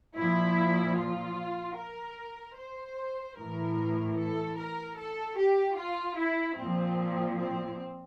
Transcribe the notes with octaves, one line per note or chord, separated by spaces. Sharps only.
A#2 F3 E4
F4
A#4
C5
A2 E3 A#4
A4
A#4
A4
G4
F4
E4
A#2 F3 C4
C4